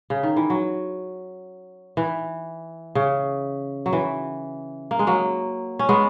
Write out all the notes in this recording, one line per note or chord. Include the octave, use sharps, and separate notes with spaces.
C#3
D#3
E3
F#3
E3
C#3
F#3
E3
A#3
G#3
F#3 A#3
C#4
G#3 B3